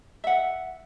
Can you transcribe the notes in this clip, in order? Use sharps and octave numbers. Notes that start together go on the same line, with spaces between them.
E5 F#5